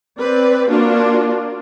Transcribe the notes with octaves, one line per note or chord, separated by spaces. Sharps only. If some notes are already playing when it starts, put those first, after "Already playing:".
C4 B4 D5
A#3 D4 F4 F#4